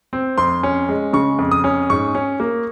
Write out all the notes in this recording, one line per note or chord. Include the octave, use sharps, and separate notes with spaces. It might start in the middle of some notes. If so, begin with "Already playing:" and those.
C4
F2 C6
C#4
G#3
C#3 C#6
F2
D#6
C#4
G#2 C#6
C#4
A#3